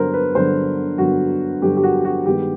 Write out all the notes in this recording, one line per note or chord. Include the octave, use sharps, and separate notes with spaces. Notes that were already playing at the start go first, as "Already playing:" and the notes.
Already playing: G2 D3 F#3 B3 A#4 C5
B4
G2 D3 F#3 B3 C5
G2 D3 F#3 B3 F#4
G2 D3 F#3 B3 G4
G4
F#4
F#4
G2 D#3 G#3 B3 G4